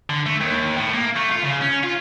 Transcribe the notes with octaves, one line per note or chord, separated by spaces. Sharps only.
D3
A3
D#2
A2
A#3
A3
F4
C#3
C#4
F4